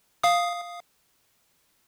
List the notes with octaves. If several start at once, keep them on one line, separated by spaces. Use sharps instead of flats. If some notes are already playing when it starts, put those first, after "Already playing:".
F5 D#6